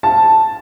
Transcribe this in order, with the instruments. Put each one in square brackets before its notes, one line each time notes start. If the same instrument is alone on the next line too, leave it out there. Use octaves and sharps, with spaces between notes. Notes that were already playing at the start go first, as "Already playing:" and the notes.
[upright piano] A5